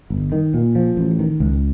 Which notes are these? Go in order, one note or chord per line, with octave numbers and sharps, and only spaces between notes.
G1
D#3
A#2
F3
A1
D#3
C#2